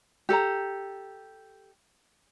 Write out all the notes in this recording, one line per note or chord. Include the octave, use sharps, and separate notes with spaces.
G4 A4 G#5 A#5